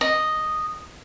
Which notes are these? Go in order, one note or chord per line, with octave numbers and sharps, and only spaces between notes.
D#5